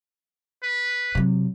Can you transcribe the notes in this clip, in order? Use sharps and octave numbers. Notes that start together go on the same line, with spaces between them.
B4
C3 F#3